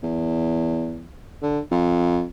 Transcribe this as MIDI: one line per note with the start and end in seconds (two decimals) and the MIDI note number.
0.03 1.05 40
1.42 1.60 50
1.71 2.25 41